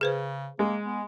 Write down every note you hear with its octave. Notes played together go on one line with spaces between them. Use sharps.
C#3 G#4 B4 C5
G#3 A#3
B3